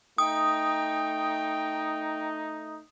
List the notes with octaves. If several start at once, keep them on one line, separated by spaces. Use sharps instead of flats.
A3 D#4 G5 D#6